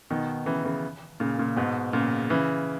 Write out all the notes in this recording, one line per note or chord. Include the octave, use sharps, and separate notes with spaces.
B2 D#3
C#3 E3
C#3 E3
A#2 C#3
A#2 C#3
G#2 B2
A#2 C#3
C#3 E3